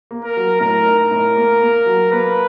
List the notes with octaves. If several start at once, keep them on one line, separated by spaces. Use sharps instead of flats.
A#3
A#4
F#3
A2 A#4
D#4
A#4
A2
A#3
A#3
F#3
A#3 B4